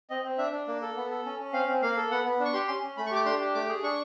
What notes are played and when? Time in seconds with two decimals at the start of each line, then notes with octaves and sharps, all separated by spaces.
0.10 C4 D#5
0.24 C4
0.38 D4 E5
0.53 D4
0.68 A#3
0.82 A4
0.96 B3
1.11 A4
1.25 C#4
1.40 C#4
1.53 C4 F5
1.68 C4
1.82 A#3 F5
1.97 A4
2.11 B3 F#5
2.25 B3
2.40 D4
2.45 C#6
2.53 G4 C6
2.68 C#4 C6
2.83 C#4
2.97 A3 B5
3.06 C#6
3.11 G4 D6
3.26 D4 C6
3.40 G4
3.55 A3 D6
3.69 G#4
3.83 D4 C#6